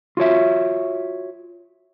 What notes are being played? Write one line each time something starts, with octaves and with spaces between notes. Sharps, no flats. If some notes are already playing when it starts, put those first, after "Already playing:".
F4 F#4 C#5 E5